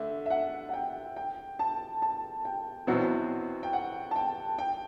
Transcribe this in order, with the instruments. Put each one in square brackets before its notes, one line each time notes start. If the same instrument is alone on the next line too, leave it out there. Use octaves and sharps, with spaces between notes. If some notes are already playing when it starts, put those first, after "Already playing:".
Already playing: [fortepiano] D3 A3 [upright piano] E5
[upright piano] E5
F#5
F#5
G5
G5
A5
A5
G5
[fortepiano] E2 B2 F#3 C4 [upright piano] F#5
[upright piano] G5
F#5
A5
G5
G5